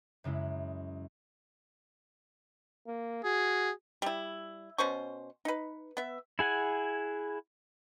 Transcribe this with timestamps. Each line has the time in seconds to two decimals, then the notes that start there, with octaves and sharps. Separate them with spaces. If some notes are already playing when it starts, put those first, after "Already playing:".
0.24 F#2 C#3 G#3 E4
2.87 A#3
3.24 F#4 G#4
4.02 G3 E4
4.78 B2 C#4 C5 C#6
5.45 D#4 B4
5.97 B3 E5
6.39 E4 G#4 F#5 G#5